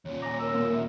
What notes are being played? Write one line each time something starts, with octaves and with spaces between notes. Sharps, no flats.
D#2 A#2 C#5
G#5 A#5 D6
A#4 E6
A#3
E5